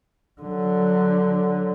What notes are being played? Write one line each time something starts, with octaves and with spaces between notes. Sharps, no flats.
D3 F#3